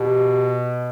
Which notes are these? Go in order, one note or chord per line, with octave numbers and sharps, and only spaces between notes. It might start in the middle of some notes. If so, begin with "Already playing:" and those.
Already playing: B2 G4